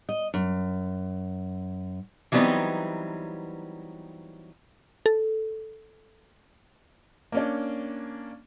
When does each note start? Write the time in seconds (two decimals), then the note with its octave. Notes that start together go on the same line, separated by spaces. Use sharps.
0.09 D#5
0.34 F#2
2.32 E3 F#3 G3 B3 C4 D#4
5.06 A4
7.32 A#3 C#4 D4